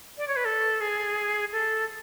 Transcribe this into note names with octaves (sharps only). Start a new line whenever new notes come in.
D5
C#5
B4
A4
G#4
A4